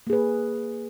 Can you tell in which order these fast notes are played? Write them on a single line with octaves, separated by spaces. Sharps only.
A#3 G#4 B4